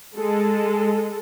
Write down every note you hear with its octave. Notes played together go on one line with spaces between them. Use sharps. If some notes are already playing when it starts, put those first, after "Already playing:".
G#3 A4